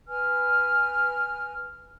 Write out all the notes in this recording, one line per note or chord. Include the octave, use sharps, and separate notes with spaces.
B4 G#5 F6